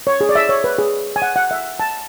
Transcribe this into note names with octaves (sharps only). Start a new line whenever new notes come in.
C#5
G#4
D5
E5
C#5
B4
G#4
G#5
F#5
F#5
E5
A5